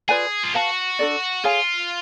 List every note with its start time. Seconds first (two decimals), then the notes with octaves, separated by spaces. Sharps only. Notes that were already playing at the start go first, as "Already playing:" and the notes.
0.08 F4 G#4 B4 D5 G#5
0.43 F4
0.54 F#4 B4 F5 A5
0.99 D4 F4 A4 D5
1.44 F4 G#4 C#5 F5 G#5